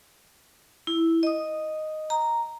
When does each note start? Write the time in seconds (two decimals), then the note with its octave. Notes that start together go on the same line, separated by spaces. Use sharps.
0.87 E4
1.23 D#5 D#6
2.10 A#5